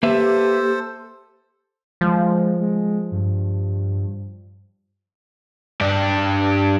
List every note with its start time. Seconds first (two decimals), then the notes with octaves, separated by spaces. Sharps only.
0.03 A#3 G4 A4 B4 C5 E5
2.01 F3 G#3
2.61 G#3
3.11 G2
5.81 G2 D4